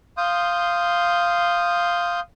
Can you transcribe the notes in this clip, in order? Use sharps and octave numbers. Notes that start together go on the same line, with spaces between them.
F5 C6 D#6 G6